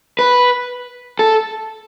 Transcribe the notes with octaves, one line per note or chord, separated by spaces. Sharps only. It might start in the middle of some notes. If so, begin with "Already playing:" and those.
B4
A4